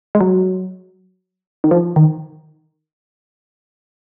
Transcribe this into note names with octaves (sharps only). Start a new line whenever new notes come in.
G#3
F#3
D#3
F3
D#3